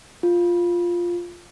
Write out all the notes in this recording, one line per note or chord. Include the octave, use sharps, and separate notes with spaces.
F4